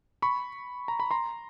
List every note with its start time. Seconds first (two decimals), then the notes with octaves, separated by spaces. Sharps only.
0.22 B5 C#6
0.88 A#5
1.00 B5
1.11 A#5 C6